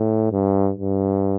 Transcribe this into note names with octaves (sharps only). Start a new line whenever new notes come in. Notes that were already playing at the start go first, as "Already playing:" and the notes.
Already playing: A2
G2
G2